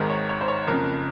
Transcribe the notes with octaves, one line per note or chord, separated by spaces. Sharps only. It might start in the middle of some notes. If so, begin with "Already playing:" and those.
Already playing: G#1 G#2 D#3 G#3 A#4
C#5
C#5
C5
C#5
F#1 F2 C#3 A#4